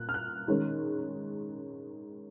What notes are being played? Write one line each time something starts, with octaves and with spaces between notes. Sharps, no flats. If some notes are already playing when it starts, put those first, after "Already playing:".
Already playing: A#2 F#6
F6
F#6
D#3 G#3 C#4